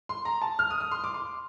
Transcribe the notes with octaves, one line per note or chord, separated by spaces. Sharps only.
C6
A#5
A5
F6
D#6
D#6
C6
D6
C6